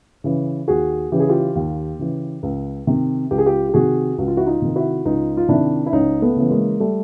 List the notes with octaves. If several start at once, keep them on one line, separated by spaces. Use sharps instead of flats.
C#3 E3
D#2 F#4 G#4
C#3 E3 G4
G#4
F4 G4
D#2
C#3 E3
C#2
C3 D#3
C#2 G4
G#4
F4 G4
G4
C3 D#3 F#4 G#4
C#2 F#4
F4
E4 F#4
D#4 F4
C3 D#3
E4 F#4
C#2 D#4 F4
F4
C3 D#3 D4 E4
E4
C#2 C#4 D#4
A3 B3
C#3 E3 B3
G#3 A#3
G3 A3